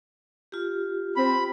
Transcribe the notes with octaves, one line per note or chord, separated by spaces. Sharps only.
F4 G4
C4 B5